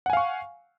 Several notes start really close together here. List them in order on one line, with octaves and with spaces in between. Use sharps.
F#5 G#5 F5 C#6